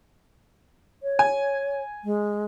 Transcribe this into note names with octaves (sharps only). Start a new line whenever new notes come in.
C#5
G#5
G#3